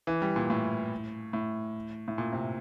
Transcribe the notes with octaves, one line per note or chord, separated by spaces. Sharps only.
E3
G3
A#2
A2
A2
A2
A#2
C3